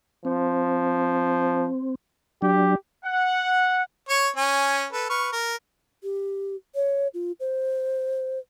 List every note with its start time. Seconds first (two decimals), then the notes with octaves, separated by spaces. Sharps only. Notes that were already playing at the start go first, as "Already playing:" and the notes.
0.25 F3 C4
2.42 F#3 D4 G4
3.04 F#5
4.09 C#5 C#6
4.37 C#4 G#5
4.93 A4 B4
5.09 B4 C#6 F6
5.32 A#4
6.03 G4
6.75 C#5
7.14 F4
7.40 C5